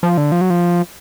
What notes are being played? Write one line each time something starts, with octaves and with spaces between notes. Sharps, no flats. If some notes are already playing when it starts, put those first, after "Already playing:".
F3
D3
F3
F#3
F3